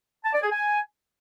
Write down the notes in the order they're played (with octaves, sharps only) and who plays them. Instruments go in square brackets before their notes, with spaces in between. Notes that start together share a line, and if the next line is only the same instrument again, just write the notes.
[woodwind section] A5
D5
G#4
G#5